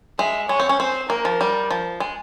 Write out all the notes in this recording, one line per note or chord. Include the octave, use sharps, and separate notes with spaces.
G#3 E5
G#3 C#5
C4
C#4
C4 C5
A#3 A#4
F3
G3
F3
G#3